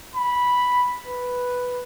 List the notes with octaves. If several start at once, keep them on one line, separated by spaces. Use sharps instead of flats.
B5
B4